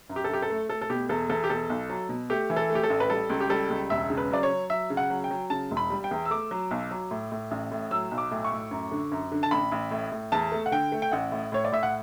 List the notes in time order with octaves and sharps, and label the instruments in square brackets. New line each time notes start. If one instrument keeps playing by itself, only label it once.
[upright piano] F#2
G4
A4
F#2 G4
A4
A3
A3 A4
A4
B2 G4
E2 A4
E2 A4
G4
B2 A4
B1
F#3
B2
A3 G4
E3
A4
A3
G4
A4
A1
B4
G3 A4
C#2
G4
G3 A4
C#2
E1 E5
C#3
B4
F#3 D5
C#5
F#3
F#3 E5
C#3
F#5
F#3
G5
F#3
C#3 A5
E1
B5
G3
G5
E2
E6
A3 D6
F#3
B1
F#3
A2
A2
A1
A2
F#3 E6
B1
D6
A2
C#6
A2
F#2
D3
F#2
D3
A5
A1 B5
A1
A2
A2
E2 A5
A3
F#5
D3 G5
A3
G5
A1 F#5
A2
A2 C#5
D5
A2 E5
F#5